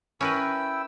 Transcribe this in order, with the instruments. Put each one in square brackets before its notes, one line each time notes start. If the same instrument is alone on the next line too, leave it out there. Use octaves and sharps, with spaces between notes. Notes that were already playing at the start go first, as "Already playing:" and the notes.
[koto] C#4 A#4 B4 [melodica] E4 G5 E6